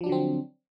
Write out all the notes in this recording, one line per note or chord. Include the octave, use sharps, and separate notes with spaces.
D3 F3 F#3 C4 D4